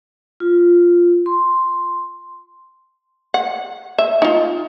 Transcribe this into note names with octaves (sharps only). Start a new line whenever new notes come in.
F4
C6
F#5
E5
D#4 F4